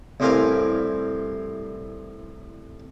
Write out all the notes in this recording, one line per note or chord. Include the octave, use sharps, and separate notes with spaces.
C2 A2 C4 A#4 F5 G#5